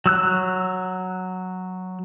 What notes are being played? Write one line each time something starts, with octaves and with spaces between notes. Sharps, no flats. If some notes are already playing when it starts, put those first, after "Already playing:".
F#3 E6 F#6